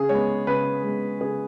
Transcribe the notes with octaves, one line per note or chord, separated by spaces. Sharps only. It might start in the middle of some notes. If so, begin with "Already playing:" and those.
Already playing: C#3 G#4
G#3 B3 C#5
C#3 B4
G#3 B3
C#3 G#4